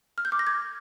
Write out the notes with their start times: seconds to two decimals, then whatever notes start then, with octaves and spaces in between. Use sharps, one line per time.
0.18 F6
0.25 G6
0.32 D6
0.39 A#6
0.47 G#6